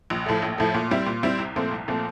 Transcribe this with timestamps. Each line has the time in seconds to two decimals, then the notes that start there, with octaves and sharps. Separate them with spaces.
0.10 A#1
0.26 A2 F3 A3
0.42 A#1
0.58 A2 F3 A3
0.74 A#2
0.91 G3 C4 E4
1.07 A#2
1.23 G3 C4 E4
1.39 C2
1.56 A#2 F3 A3 C4
1.72 C2
1.88 A#2 F3 A3 C4